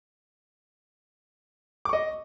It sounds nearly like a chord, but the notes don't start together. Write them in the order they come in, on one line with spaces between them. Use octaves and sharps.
D6 C#6 D#5